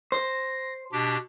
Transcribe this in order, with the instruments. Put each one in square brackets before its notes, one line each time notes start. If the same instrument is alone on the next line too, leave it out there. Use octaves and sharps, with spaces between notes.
[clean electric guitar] C5 [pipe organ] A#6
[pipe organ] B2 D4 G4